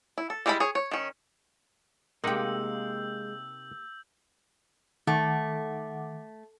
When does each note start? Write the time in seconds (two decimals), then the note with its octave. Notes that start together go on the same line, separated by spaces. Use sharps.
0.18 E4
0.30 A4
0.46 G3 G#3 E4 G#4 B5
0.60 G#4 C#5
0.75 C#5
0.91 D#3 C#4
2.24 C3 G#3 A#3 D#4 G4 F#5 E6 G6
5.07 D#3 A3 F#5 D6